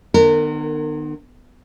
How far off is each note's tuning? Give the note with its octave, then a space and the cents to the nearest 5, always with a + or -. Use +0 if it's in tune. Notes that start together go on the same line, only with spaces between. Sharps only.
D#3 -40 B3 -5 A#4 -30